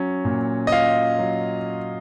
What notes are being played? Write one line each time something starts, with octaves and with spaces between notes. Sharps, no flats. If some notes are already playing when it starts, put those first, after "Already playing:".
Already playing: F#3 C#4
A#2
D#5
F4 F5
F#3